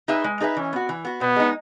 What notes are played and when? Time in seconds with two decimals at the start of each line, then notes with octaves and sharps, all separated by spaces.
0.08 D#4 G#4 B4 E5
0.24 G#3
0.41 D#4 G#4 B4 E5
0.57 E3 C#4
0.73 B3 F#4
0.89 E3
1.05 B3 F#4
1.21 B2 B3
1.36 G#3 D#4